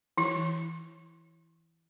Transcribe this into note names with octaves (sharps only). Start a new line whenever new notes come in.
E3 E4